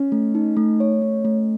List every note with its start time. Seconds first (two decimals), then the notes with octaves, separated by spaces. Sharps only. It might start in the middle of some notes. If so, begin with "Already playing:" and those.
Already playing: C#4
0.12 A3
0.35 D#4
0.57 A3
0.80 C#5
1.02 A3
1.25 A3